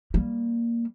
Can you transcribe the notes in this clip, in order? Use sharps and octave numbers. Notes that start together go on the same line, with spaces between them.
G3 A#3